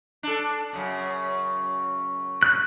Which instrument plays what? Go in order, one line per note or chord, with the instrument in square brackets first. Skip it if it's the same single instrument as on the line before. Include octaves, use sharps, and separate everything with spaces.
[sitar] D4 A4
F#2 C#3
[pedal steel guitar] F#6